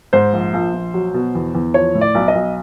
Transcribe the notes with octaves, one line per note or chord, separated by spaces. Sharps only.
G#2 C5
A#1
A#1
A#1
F#3
B2
E2
E2
F3 C#5
A2
D5
B1
D#5
B1